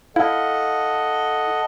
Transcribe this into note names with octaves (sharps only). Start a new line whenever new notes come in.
E4 A4 D#5 F5 F#5